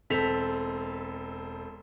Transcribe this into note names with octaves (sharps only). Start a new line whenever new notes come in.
E1 C4 A4 B6 F7